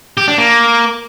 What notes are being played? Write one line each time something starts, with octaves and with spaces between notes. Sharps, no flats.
G4
D4
A#3